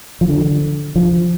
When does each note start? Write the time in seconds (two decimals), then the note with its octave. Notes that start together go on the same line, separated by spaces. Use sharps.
0.21 F3
0.29 D3
0.96 F3